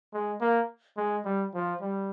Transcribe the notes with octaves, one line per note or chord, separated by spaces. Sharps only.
G#3
A#3
G#3
G3
F3
G3